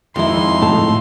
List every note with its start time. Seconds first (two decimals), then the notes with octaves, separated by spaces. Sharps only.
0.16 F2 D#3 G#3 D#4 E4 C6
0.62 A2 A4